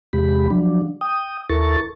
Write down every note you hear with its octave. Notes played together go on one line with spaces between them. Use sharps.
E2 C3 G#3 G4 B5
F3 F#3 D4
G5 D#6
D#2 E4 A4 A#4 C#6 A6